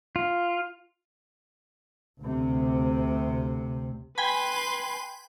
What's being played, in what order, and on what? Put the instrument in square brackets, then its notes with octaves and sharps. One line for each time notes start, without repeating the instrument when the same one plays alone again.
[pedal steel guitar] F4
[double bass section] D2 C3
[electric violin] B4 C6 [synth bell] G5 G#5 B5